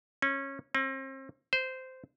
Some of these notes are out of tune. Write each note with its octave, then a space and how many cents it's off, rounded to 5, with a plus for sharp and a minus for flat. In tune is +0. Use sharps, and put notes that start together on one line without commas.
C#4 -20
C4 +40
C5 -15